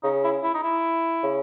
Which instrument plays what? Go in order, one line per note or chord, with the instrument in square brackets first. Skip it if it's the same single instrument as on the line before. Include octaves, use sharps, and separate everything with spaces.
[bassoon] C#3 [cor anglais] D#4
[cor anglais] E4
E4
D#4
E4
[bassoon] C#3